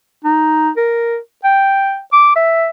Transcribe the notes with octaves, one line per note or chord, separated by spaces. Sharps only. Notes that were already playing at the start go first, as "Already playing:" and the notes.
D#4
A#4
G5
D6
E5